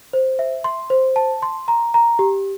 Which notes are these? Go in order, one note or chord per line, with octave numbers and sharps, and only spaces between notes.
C5
E5
C6
C5
A5
C6
A#5
A#5
G4